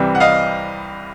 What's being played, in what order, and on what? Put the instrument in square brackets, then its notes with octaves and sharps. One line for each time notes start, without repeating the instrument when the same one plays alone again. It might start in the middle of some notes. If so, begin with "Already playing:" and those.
Already playing: [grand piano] C2 C3 E3 G3 C4
F#5
D#5 F5